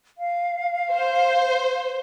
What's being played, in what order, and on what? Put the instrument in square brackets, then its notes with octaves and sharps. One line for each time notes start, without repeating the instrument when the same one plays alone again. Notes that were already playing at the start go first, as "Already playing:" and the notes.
[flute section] F5
[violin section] C5